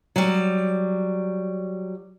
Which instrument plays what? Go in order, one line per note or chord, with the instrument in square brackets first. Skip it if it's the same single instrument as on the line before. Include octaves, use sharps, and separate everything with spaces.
[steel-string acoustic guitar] F#3 G3